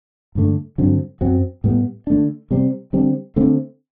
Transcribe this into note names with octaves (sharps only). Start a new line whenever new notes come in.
G2 D3 A3
G2 D3 F#3 C4
F#2 F#3 C4
A2 G3 B3
D3 A3 D4
C3 G3 C4
D3 G3 C4
D3 A3 C4